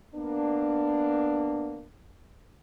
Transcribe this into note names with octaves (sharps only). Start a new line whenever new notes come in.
A#3 B3 D4